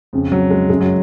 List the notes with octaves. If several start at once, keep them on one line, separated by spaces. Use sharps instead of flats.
F2 C#3
F#3
G#3
F#2 C#3 G#3
F#3